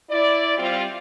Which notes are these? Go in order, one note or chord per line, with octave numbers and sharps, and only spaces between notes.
E4 D5
G3 C4 F4